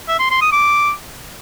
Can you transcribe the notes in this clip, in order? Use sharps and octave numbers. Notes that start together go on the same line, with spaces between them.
E5
C6
C6
D#6
D6